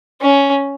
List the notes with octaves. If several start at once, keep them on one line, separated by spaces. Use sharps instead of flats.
C#4